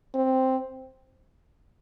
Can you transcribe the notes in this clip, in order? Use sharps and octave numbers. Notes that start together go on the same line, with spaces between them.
C4